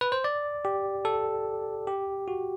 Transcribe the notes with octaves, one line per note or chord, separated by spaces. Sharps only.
B4
C5
D5
G4
A4
G4
F#4